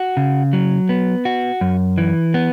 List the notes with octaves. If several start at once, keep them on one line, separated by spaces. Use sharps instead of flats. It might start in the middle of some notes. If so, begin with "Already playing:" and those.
Already playing: F#4
C#3
F#3
B3
F#4
F#2
E3
B3